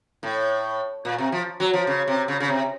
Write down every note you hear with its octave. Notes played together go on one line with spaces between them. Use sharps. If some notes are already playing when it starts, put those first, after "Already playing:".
A2
A#2
C3
F3
F#3
F3
C#3
C3
C#3
C#3
C3